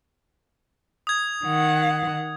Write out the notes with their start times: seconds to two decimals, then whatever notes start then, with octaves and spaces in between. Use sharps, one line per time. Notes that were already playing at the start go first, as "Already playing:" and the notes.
1.07 D#6 G#6
1.44 D#3 F#5